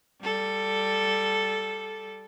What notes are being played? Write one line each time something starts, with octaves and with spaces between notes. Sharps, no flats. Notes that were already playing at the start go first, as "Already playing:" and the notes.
G3 A4